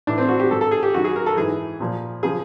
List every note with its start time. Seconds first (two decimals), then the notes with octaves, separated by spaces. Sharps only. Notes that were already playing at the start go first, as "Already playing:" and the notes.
0.07 A2 E3 D4
0.18 C4
0.29 F#4
0.40 G4
0.50 G#2 D#3 A4
0.61 A4
0.71 G#4
0.83 G4
0.93 F#2 D#3 F#4
1.04 G#4
1.16 A#4
1.26 A4
1.36 G#2 E3 G#4
1.80 A#2 F3
2.23 C#3 F3 G#4